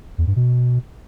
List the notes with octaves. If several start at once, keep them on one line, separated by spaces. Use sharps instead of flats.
E2
G2
B2